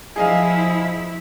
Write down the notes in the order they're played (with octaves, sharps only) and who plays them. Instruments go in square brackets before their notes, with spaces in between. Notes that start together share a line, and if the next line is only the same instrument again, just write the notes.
[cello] F3 E4 [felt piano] G#4 D#5 F5